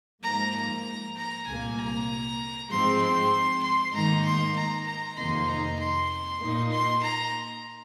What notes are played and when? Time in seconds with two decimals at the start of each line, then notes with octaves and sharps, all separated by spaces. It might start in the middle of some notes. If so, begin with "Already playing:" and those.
0.23 G#2 F3 A#3 A#5
0.55 A#5
1.17 A#5
1.47 C2 A#2 A#3 G#5
1.78 A#5
2.70 G#2 F3 G#3 C4 C6
3.02 C6
3.63 C6
3.94 G#2 D#3 A#3 D#4 A#5
4.25 C6
4.57 A#5
4.87 A#5
5.17 F2 C3 D#3 A#3 D#4 C6
5.48 A#5
5.80 C6
6.41 A#2 A#3 D#4
6.72 C6
7.03 A#5